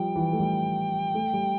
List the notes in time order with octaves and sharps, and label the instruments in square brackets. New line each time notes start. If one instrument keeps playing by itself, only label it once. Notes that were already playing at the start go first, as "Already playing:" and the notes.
Already playing: [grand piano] F3 G3 [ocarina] G5
[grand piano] E3
A3
G3
A3
G3